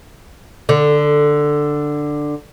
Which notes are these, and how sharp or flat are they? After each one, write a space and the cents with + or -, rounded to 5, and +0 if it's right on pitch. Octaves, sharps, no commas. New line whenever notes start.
D3 +10